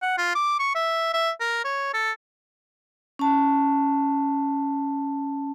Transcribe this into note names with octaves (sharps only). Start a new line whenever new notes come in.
F#5
F4
D6
C#6
E5
E5
A#4
C#5
A4
C#4 A5